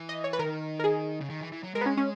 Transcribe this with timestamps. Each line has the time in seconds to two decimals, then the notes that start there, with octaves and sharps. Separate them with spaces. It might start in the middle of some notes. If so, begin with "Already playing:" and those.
Already playing: E3
0.09 D#5
0.24 C#5
0.33 B4
0.39 D#3 A#4
0.79 A#4
0.84 G#4
1.21 C#3
1.30 D#3
1.41 E3
1.52 E3
1.63 F#3
1.74 G#3 A#4
1.81 B3
1.86 C#4
1.97 C#4